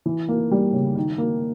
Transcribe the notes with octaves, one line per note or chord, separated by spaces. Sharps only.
E3
A#3
G3
C#3
D#3
A#3